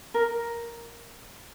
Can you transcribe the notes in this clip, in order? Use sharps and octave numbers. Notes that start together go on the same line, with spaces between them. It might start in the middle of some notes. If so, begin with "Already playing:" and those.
A#4